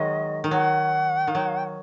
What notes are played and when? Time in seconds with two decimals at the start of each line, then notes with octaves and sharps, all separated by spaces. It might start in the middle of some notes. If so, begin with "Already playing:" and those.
Already playing: D#3 F#3 G#3 D#5
0.44 D#3
0.51 F#3 F#5
1.27 D#3
1.35 F#3